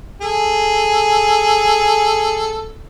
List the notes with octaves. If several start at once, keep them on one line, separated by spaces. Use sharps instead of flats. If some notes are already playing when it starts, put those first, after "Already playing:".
G#4 A4